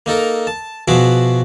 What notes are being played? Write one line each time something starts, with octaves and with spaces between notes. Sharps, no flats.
A#3 D#4 A4 A#4
A5
B2 F3 F#4 G#4 E5 D6